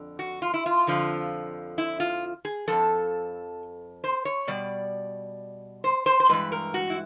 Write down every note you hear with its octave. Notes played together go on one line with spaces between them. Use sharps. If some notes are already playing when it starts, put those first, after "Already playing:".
Already playing: F2 D3
F#4
F4
E4
F4
F2 D3 F3
E4
F4
G#4
F2 C#3 F3 A4
C5
C#5
B2 G3 D5
C5
C5
C5
G2 E3 G#3 B4
A#4
F#4
E4